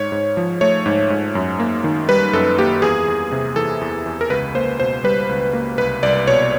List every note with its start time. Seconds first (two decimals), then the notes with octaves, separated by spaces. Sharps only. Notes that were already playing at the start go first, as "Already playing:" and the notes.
Already playing: G#2 C#5
0.12 G#2
0.37 F3
0.61 A3 C#5
0.86 G#2
1.10 G#2
1.35 F#2
1.60 A#3
1.84 D#3
2.09 G3 B4
2.33 F#2 A4
2.58 A#3 G4
2.82 E2 G#4
3.08 E2
3.32 C3
3.56 E3 A4
3.81 E2
4.06 E2
4.21 A#4
4.30 C#2 B4
4.55 A#3 C5
4.80 B2 C5
5.04 G3 B4
5.29 C#2
5.53 A#3
5.78 C2 B4
6.03 C2 D5
6.27 B2 C#5